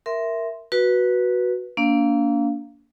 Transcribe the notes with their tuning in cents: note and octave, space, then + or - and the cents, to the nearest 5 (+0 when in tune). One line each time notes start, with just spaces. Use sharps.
A#4 +0 E5 +0 C6 +0
F#4 +0 B4 -15
A#3 +0 D4 -40 F5 +0